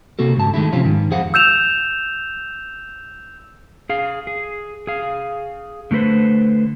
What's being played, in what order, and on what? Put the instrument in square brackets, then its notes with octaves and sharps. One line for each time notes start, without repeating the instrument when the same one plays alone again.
[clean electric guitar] C3 A#3 F#4 A4
C#2 G#2 A5
D#3 G#3 A3 E4
C3 F3 C4 C#4 F4
G#2 D#3
F2 F3 G#4 C5 F5 F#5
[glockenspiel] E6 G6 E7 F7
[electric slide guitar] G#4 F5
G#4
G#4 F5
D3 A3 G#4 B4 C5